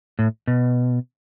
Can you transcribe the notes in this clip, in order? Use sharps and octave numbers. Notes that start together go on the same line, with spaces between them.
A2
B2